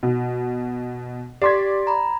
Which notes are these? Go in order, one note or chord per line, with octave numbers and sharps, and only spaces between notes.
B2
G4 D5 C6 G#6 B6
A#5 B5